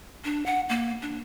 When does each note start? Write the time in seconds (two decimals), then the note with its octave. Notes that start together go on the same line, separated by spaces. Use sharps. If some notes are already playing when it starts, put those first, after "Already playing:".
0.25 D4
0.46 F#5
0.69 A#3
1.02 D4